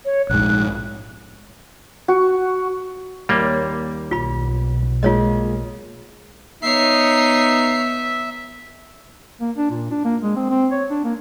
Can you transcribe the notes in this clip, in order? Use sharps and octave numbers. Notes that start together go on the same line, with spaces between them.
C#5
A#1 G#2 F#6
F#4
D#2 G3 A#3
B1 F4 B5
G#3 A#3 F4 C#5 D#5
B3 D#4 C#5 E5 C7
A#3
D4
A#2
D4
A#3
G#3
C4
C4
C#5
D4
A#3